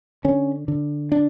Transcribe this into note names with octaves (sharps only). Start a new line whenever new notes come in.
D3 C#4
D3
D4